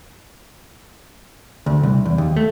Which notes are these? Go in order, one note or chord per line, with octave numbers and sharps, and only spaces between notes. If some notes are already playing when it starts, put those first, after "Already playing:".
D2
C2
E2
D#2
A3